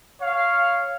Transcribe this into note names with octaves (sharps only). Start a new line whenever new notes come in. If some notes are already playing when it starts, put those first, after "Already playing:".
C#5 F5